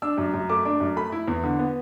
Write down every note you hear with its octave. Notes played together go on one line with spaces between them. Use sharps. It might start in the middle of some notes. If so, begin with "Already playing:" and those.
D4 E6
F#2
F#2
A3 D6
D4
F#2
A3 B5
E4
E2
D3
B3